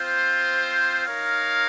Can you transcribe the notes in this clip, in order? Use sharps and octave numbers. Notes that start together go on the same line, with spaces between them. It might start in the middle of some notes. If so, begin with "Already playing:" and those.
Already playing: C4 F4 C5
D#4 A#4 C#5 F5